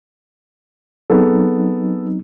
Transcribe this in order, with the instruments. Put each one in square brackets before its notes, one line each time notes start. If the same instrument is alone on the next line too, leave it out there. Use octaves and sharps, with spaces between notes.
[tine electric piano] F#3 C4 D#4 [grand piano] B3 G#4 A4